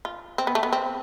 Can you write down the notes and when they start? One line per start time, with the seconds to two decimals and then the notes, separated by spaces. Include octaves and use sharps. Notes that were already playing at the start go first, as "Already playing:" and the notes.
0.05 F4
0.38 C4
0.47 B3
0.55 A3
0.63 B3
0.73 C4